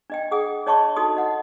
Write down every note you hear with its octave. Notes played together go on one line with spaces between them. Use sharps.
D4 D#5 G5
G#4 F#5 G5 D#6
D4 C#5 D#5 A5 C6 C#6
D#4 F#4 A4 A5 C6 D#6
D#5 F#5